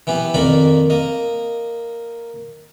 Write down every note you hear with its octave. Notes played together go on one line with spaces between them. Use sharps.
E3 B3 G4
F2 D#3 A#3 D5 B5
A#3 D#5